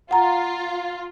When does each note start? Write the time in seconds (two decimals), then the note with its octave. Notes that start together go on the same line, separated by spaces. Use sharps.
0.11 F4 F#5 A#5